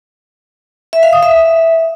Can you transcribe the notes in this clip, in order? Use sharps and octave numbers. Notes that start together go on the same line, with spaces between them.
E5
F5
D#6
E5